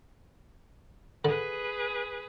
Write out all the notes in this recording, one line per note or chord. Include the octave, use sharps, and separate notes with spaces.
D3 G#4 B4